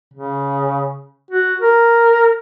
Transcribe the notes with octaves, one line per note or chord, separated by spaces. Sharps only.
C#3
F#4
A#4